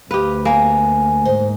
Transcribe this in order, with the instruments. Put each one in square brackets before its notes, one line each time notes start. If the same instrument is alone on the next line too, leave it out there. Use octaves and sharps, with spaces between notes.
[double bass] D2 [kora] G4 B4 [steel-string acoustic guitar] D#5 F5
[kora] A#3 [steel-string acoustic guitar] B3 A#4 [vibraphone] G#5
[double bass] G#2 [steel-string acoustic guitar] C5 D#5